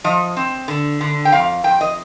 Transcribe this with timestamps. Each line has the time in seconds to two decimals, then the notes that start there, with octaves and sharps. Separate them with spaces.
0.04 F3 D#5
0.37 C4
0.68 D3
1.01 D3
1.25 G5
1.32 F2 F5
1.64 F2 G5
1.81 D#5